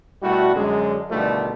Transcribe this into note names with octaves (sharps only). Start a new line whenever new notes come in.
B2 G3 A3 E4 F#4
F#2 D3 G#3
B2 D3 D#3 F3 G3 A3